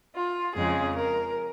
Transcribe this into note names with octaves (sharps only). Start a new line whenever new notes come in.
F4
F2 C#3 G#3 G#4
A#4